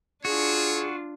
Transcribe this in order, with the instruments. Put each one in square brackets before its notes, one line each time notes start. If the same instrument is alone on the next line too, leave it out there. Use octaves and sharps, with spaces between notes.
[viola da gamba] D4 F4 [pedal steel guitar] F#4 [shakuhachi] G#4 [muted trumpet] C#5